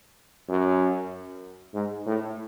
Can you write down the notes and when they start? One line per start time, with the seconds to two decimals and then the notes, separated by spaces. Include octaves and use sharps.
0.49 F#2
1.74 G#2
2.06 A2